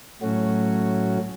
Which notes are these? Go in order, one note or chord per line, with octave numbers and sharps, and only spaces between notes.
A2 F#3 A3 C#4 F#4